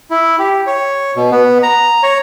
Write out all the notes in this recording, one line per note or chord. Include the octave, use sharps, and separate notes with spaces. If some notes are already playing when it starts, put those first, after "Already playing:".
E4
G4
C#5
B2
B3
A#5
C#5